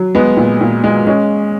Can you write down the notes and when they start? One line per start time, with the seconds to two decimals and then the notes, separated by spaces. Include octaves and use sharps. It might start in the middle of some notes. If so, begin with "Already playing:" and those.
Already playing: F#3
0.15 G#3 B3
0.37 A#2
0.61 A#2
0.84 G#3
1.07 G#3 C#4